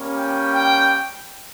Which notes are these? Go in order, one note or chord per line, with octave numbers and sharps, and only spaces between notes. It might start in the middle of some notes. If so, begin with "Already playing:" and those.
Already playing: G3 A#3 C#4
G5
G5